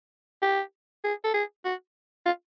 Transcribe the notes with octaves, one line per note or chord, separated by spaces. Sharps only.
G4
G#4
A4
G#4
F#4
F4